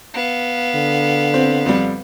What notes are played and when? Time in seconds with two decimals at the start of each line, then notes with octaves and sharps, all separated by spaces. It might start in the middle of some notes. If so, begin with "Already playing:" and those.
0.14 B3 F5
0.75 D3
1.34 C4
1.66 F2 G3